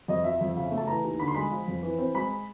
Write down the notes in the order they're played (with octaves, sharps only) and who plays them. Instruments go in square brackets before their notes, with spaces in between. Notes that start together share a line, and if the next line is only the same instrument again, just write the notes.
[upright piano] F2 D#5
F3 E5
F2
C#3
A3
A5
E3 A#5
D#2
D3 B5
C6
G#3 B5
F3
F2
E3
C4
G#3 B5